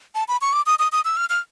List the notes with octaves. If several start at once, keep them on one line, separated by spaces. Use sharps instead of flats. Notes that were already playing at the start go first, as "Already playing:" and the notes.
A5
B5
C#6
D6
D#6
D#6
D#6
E6
F6
F6